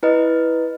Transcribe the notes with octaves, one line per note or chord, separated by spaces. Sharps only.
E4 B4 D#5